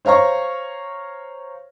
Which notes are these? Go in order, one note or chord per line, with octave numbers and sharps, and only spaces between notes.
C5 C#5 F5 A#5 C#6